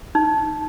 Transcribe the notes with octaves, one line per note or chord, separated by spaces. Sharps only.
D#4